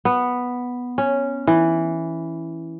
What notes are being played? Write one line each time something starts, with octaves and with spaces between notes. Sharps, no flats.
B3
C#4
E3